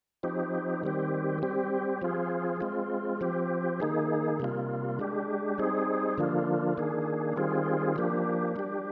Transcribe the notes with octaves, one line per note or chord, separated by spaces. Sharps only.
F3 C4 D#4 G4
D#3 G3 C4 G4
G3 C4 G4
F3 C4 F4 G#4
G#3 C4 F4
F3 C4 G4
D#3 A#3 D#4 G#4
C3 G3 A#3 F4
G#3 D4 G4
G3 C4 D#4 G#4
D3 F3 A#3 D4 F4
D#3 A#3 D4 G#4
D#3 G3 C4 F4 G#4
F3 A#3 D4 G4
G3 D4 G4